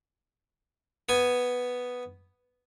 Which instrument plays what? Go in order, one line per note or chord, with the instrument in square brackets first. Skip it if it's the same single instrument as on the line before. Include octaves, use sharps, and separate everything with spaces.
[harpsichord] B3 G#5